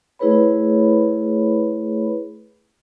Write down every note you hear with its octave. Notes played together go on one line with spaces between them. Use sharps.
A3 E4 G#4 B4 C#5 B5